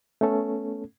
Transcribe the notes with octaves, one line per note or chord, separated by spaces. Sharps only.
A3 B3 C#4 A4